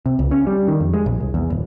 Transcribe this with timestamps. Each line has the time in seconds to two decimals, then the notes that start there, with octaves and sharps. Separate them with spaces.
0.06 C3
0.19 C#2
0.31 C#4
0.47 G3
0.68 D#3
0.80 F2
0.94 G#3
1.06 A#1
1.20 C2
1.34 E2
1.50 D1